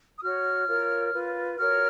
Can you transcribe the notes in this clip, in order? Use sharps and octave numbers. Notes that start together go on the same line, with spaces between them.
D#6
F#4 C#5 F6
F4 A#4 C#5
F4 B4
F#4 A#4 C#5 F6